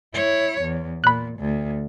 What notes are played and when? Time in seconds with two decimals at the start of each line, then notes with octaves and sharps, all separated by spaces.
0.14 E4 C#5
0.61 E2
1.04 A#2 B5 F#6
1.39 D2